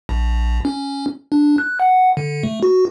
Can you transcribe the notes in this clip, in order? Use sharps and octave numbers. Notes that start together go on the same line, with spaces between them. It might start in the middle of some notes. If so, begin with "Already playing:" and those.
A#1
C#4
D4
F#6
F#5
D3
A3
F#4